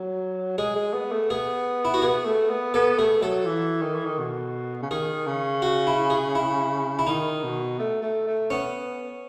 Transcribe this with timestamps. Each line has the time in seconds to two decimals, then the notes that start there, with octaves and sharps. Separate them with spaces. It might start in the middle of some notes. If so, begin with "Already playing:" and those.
Already playing: F#3
0.58 G#3 G#4
0.76 G#3
0.93 B3
1.12 A3
1.30 B3 G#4
1.85 E4
1.94 F#4
2.02 B3 G#4
2.26 A3
2.50 B3
2.74 B3 A4
2.98 A3 G#4
3.22 F#3 A4
3.46 E3
3.82 D#3
3.95 E3
4.06 D#3
4.19 B2
4.82 C#3
4.91 D#3 G#4
5.26 C#3
5.62 F#4
5.87 E4
6.10 G#4
6.35 E4
6.99 E4
7.06 D#3 D#4
7.43 B2
7.79 A3
8.02 A3
8.27 A3
8.50 B3 C#4